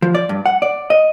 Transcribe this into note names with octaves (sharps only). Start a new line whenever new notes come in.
F3
D5
G2
F#5
D5
D#5